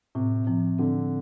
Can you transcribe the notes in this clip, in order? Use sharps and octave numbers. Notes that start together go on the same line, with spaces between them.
A2 C3
C3 F3
D3 C4